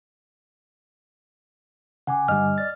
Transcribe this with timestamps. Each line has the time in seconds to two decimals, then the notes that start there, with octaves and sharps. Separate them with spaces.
2.07 C#3 F#5 G#5 D6
2.28 G2 D3 G3 D#5 F6
2.58 D5 A6